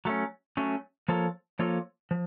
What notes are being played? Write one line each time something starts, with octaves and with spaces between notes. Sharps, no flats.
F#3 A3 C#4
F#3 A3 C#4
F3 A#3 F4 A4 C#5
F3 A#3 F4 A4 C#5
F3